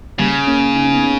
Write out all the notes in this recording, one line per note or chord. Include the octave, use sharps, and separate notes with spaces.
C#3 G3 A#3
A#3 C#4
D#4
C#4
B3 D#4
B3 D#4